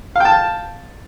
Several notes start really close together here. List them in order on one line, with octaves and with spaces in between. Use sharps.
F5 G5 A5